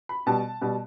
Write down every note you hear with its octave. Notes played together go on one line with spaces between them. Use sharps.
B5
B2 G3 A5
B2 G3